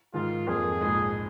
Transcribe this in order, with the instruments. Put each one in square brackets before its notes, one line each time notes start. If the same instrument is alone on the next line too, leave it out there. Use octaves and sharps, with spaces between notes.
[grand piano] G#2 D#3 G#3 [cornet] F4
[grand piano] F2 F3 A#3 [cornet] G#4
[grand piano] A#1 G#2 G#3